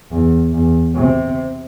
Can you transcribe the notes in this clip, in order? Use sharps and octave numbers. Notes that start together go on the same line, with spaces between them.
E2
E2
C3